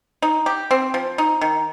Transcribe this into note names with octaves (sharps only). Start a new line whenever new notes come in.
D#4
G4
C4
F3
D#4
D#3